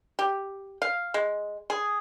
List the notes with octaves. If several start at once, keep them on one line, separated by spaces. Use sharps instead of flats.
G4
F5
G#3
G#4